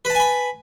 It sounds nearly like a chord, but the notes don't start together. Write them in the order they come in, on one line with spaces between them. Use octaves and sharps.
B4 A5 G#5 B5